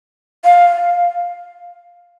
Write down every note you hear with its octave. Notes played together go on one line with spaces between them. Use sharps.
F5